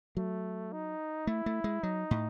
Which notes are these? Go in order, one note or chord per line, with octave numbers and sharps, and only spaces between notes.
F#3 A3
D#4
A3 E4
A3
G#3
F#3 D#4
A2